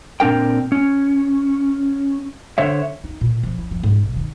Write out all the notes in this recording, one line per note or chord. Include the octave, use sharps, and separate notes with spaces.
A#2 C4 D4 A#4 G5
C#4
D3 C5 C#5 E5
D#4
A#2
F3
E4
F3
G#2
B1
D#3